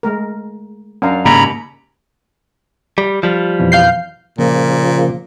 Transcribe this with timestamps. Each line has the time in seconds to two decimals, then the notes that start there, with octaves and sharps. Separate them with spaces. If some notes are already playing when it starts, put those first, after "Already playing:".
0.03 G#3 A3 A#4
1.02 F#2 C#4 D4 F5 A#5
1.25 D#2 G#2 C#3 A#5 B5
2.98 G3
3.23 F3 G3
3.59 F2 B2 E3
3.72 F5 G6 C7
4.39 A#2 C#3 F3 A#3